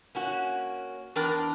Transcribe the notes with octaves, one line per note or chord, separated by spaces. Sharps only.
A#3 C#4 F#4
E2 D4 A#4 G5